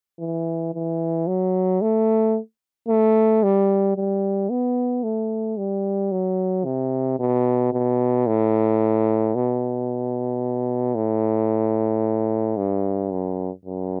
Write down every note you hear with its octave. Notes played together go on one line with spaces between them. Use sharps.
E3
E3
F#3
A3
A3
G3
G3
B3
A3
G3
F#3
C3
B2
B2
A2
B2
A2
G2
F#2
F#2